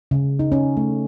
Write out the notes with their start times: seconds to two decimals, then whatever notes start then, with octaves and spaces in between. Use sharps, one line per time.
0.11 C#3
0.39 D#4
0.52 C#4
0.77 A3